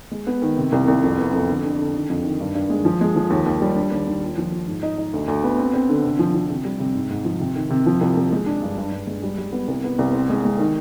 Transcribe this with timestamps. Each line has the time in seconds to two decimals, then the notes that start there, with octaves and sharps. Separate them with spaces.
0.11 G#3
0.27 B3
0.42 D#3
0.58 C3
0.72 C2
0.88 C2
1.03 F2
1.18 B3
1.33 F2
1.48 D3
1.63 D4
1.79 D3
1.94 D#3
2.10 F2
2.24 D#3
2.40 G2
2.55 G2
2.70 G#3
2.85 F3
3.01 G#3
3.16 F3
3.30 D#2
3.46 D#2
3.62 G3
3.76 D4
3.91 D#2
4.06 D#2
4.21 F4
4.38 F3
4.52 F4
4.68 G#2
4.83 D#4
4.98 D#4
5.13 D2
5.28 D2
5.44 B3
5.58 C4
5.74 C4
5.89 D3
6.04 C3
6.19 F3
6.35 F3
6.50 C3
6.65 G3
6.80 C3
6.95 G#2
7.10 G#2
7.25 F3
7.40 C3
7.56 D#3
7.70 C3
7.86 F3
8.01 C2
8.17 C2
8.32 G#3
8.46 D4
8.63 G2
8.78 G2
8.92 G2
9.07 G#3
9.23 G3
9.38 G3
9.52 B3
9.68 C2
9.84 B3
9.99 C2
10.13 C4
10.30 G#3
10.45 G#3
10.59 D#3